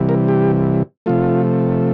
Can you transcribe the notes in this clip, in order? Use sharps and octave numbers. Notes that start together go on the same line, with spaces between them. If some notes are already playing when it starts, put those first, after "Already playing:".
Already playing: C3 E3 G3
A#4
G4
C3 F3 A3 F4